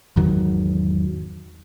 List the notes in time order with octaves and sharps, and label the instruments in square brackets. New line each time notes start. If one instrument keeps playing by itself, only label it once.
[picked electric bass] G#1 E2 D#3 F#3